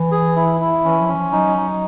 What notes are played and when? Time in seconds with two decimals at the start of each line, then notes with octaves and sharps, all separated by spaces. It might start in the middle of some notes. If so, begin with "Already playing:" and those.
Already playing: E3
0.12 G#4
0.36 E4
0.60 E4
0.85 E3 C#4
1.00 F3
1.08 C#4
1.16 F3
1.32 F#3 D#4
1.57 D#4